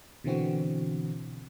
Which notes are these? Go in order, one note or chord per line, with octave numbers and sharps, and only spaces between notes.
B2 D3 E3 C4 F#4